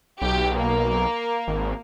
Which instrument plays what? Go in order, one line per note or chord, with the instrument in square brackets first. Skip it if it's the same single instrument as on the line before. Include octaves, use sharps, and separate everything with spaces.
[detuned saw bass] B1 [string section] G4
[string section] A#3
[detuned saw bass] G#1